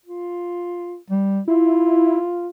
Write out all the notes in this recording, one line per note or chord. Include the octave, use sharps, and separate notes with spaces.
F4
G3
E4 F4